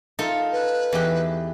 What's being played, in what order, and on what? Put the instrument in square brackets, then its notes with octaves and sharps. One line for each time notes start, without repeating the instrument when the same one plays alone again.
[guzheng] D#4 F4 A4
[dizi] B4
[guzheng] E2 G4